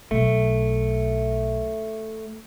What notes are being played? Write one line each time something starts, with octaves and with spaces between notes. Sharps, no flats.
B1 A3